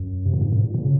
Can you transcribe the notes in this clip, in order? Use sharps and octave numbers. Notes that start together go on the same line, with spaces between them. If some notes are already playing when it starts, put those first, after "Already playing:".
Already playing: F#2
C3
A#2
G#2
G#2
A#2
A#2
C#3